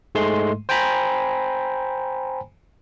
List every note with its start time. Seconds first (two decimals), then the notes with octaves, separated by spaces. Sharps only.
0.15 G#2 G#3 A3 C6
0.69 C5 G5 G#5 A#5 B5